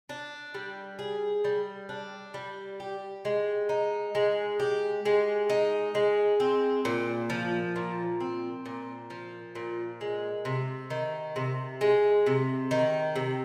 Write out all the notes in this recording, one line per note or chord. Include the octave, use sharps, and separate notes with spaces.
D4
G3
G#4
G3
D4
G3
G4
G#3
D#4
G#3
G4
G#3
D#4
G#3
C4
A#2
F3
A#2
C4
A#2
F3
A#2
G#3
C3
D#3
C3
G#3
C3
D#3
C3